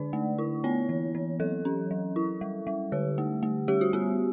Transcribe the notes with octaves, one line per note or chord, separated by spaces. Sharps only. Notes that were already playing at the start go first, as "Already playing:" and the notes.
Already playing: D3 D4 D5
A3
E4
B3 C#5
E3
E3
F#3 A4
C#4
F#3
E4
G3
G3
D3 G4
A3
A3
G3 G4
F#4
B3 G4